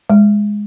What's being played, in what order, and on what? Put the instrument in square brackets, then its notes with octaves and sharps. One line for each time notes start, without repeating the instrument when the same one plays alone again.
[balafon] G#3